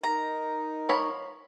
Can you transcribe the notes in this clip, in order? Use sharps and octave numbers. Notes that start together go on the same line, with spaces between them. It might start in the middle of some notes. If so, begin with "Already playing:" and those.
D#4 A#4 A#5
F3 C#5 B5